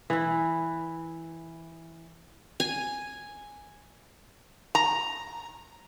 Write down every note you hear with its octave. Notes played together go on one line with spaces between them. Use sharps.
E3 E4
G#5
A#5